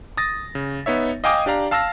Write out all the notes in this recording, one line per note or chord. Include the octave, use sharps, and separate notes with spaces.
D#6 A6 A#6
C#3
B3 D#4 C#5 E5
D#5 F5 G5 G#5 D6 D#6
D4 G4 D5 F5 A#5
F5 A5 E6 F6 A#6